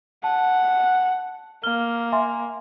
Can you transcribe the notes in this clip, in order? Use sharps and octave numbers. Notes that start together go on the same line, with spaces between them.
F#5 A5
A#3 F6 G7
E5 G#5 C6